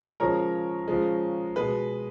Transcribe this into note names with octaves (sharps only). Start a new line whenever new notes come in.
C#3 F3 G#3 A#4 C#5
C#3 F3 G#3
B2 G#3 B4